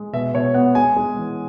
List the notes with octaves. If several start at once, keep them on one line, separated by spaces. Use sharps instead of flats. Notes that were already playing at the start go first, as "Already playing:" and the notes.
Already playing: G#3
B2 E5
B2 C#5
B3 F#5
G#3 G#5
G#3
E3